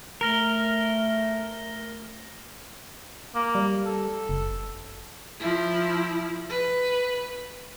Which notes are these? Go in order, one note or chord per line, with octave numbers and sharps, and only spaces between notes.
A3 A#4 F6 A#6 G7
A#3
G3
A4
F#1
F3 E4
B4